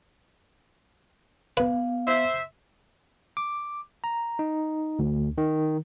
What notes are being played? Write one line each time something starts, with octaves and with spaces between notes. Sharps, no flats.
B3 B4 F5
C5 E5
D6
A#5
D#4
D2
D#3